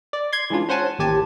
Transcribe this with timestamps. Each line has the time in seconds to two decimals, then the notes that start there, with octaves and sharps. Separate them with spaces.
0.13 D5
0.32 C6 G#6
0.50 E3 G#3 C#4 D4 F4
0.69 C#4 C5 F#5 G#5 A5
0.98 A1 D#2 G4 G#5 A5